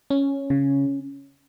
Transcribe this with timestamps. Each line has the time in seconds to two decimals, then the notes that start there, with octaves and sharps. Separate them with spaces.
0.10 C#4
0.50 C#3